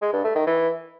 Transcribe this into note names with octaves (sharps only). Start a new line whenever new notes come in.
G#3
G2
A3
D#3
E3